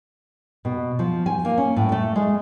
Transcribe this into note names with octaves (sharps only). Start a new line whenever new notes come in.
B2
F3
G#5
A#3
C#4
A2
A3
G#3